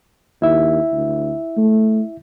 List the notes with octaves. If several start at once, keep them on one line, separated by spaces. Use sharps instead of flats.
D#2 E4 E5
D2
A3